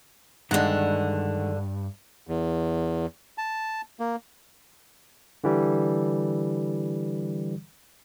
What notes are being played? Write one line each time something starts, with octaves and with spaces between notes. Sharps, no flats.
G2 D3 D#3 G#3 F#5
E2
A5
A#3
D3 E3 G3